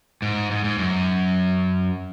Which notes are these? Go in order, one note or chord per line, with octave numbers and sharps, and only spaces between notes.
G#2
G#2
G#2
F#2